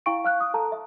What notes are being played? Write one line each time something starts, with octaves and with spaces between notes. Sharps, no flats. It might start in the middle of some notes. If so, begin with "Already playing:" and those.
E4 F5 G5 C#6 D7
F5 F6 F#6
D#6
A4 A5 A#5
E5